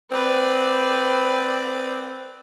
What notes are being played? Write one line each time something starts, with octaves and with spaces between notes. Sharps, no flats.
C4 B4 D5